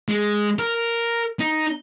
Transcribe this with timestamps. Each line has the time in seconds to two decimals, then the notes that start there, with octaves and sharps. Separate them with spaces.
0.09 G#3
0.59 A#4
1.40 D#4